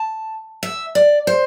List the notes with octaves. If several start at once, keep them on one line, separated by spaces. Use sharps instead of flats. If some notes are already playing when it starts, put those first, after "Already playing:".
Already playing: A5
E5
D5
C5